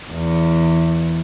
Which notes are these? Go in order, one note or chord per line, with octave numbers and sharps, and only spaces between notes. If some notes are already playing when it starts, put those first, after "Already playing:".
E2